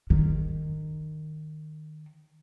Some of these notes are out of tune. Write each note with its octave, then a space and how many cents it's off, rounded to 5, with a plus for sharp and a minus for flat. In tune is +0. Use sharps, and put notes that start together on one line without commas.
D#3 -15